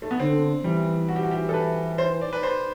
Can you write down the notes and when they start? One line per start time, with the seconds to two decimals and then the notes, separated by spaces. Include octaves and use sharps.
0.02 A3
0.11 B3
0.19 D3 C4
0.64 E3 G3
1.09 F#4
1.16 G4
1.23 F#4
1.31 G4
1.49 A4
1.54 B4
1.98 C5
2.21 D5
2.33 B4
2.43 C5